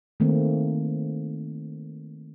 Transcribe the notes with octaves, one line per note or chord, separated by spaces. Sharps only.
D#3 A3 A#3 C4